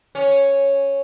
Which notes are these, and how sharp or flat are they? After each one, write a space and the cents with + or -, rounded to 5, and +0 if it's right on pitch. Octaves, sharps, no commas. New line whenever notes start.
C#4 -5